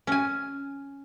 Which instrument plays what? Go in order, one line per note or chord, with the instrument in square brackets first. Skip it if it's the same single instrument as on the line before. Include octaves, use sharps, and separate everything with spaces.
[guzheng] C#4 G#5